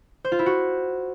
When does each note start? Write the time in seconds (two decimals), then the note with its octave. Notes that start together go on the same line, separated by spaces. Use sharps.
0.24 C5
0.32 F4
0.39 E4
0.46 F#4